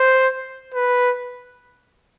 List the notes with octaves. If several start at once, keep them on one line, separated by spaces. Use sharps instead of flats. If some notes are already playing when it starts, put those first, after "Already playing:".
Already playing: C5
B4